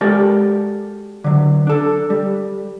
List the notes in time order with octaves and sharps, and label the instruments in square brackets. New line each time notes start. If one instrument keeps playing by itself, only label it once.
[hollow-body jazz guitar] G#3 F#4 G4 A4 A#4 D5
D3 F#3
D4 A4
G3